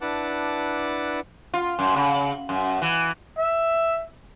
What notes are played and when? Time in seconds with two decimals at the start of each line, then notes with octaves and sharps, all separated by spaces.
0.01 D4 E4 B4 F#5 A5 D6
1.54 F4
1.79 F#2
1.96 C#3
2.49 F#2
2.82 E3
3.38 E5